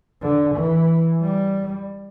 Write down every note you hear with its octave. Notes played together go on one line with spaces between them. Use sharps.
D3
E3
G3